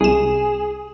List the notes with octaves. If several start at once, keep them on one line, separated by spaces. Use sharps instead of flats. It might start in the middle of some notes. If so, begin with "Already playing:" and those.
C2 G#4 E7